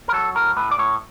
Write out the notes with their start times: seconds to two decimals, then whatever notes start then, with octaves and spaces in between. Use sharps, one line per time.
0.08 A#4
0.13 F#3 A4
0.35 A2 A#4
0.57 A2 B4
0.71 D5
0.79 A2 C#5